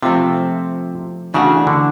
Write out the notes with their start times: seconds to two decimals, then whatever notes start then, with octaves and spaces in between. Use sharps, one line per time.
0.03 C3 F3 A3 C4 F4
1.34 C#3 E3 A3 D4 F#4
1.67 D3